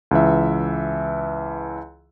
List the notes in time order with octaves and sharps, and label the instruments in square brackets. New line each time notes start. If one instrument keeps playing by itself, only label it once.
[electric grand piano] C#2 E3 E5